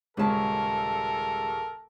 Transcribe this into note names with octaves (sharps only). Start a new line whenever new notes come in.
D#1 C#3 G#3 C#4 A4 A#4 A5